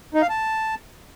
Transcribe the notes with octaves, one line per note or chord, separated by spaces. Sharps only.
D#4
F5
A5